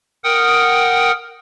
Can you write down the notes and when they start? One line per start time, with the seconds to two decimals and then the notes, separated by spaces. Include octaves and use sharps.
0.24 A#4 F#5 G5 D#6